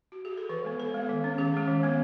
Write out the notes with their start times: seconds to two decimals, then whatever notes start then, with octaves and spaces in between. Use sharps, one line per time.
0.12 F#4
0.25 G#4
0.37 A4
0.49 E3 B4
0.64 G#3 B3
0.79 E3 A4
0.94 G#3 B3
1.09 D#3
1.24 G#3 C#4
1.38 D#3 G#4
1.54 G#3 C#4
1.68 D#3
1.83 G#3 B3